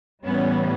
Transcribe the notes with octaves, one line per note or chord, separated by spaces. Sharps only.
A2 E3 G3 B3 C#4